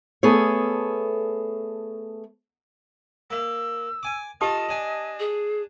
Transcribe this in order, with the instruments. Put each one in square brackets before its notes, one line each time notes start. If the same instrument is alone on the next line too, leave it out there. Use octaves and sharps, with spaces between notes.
[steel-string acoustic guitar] A3 B3 G#4 A4 C#5
[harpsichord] A#3 [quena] E6
[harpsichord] G#5 D6
[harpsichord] F4 A4 [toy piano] G4 A5 D#6 [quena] D#5
[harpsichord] D4 G#5
[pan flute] G#4